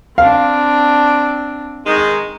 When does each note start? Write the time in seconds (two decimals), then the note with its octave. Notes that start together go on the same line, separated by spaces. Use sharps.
0.18 C4 D4 F5
1.86 D#3 G#3